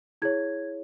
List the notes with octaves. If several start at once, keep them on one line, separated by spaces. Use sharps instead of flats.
E4 G#4 C#5 G#6